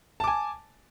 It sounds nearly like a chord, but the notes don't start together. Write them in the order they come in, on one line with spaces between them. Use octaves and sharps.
A5 D6 G#5